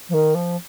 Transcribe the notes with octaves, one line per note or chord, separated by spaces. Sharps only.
F3
D#3
F3